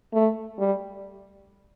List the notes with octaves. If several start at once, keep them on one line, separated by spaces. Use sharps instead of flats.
A3
G3